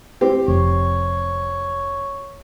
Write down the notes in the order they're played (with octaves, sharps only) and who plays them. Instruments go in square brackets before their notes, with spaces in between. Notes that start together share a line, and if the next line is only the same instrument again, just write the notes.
[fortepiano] C4 G4
[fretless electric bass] F1 [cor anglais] C#5